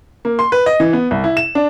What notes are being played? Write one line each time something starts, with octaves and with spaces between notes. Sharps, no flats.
A#3
C6
B4
D#5
E3
B3
C2
E4
E7
D4